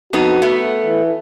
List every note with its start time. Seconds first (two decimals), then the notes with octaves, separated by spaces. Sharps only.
0.13 F2 B3 D#4 F#4
0.42 A3 B3
0.86 E3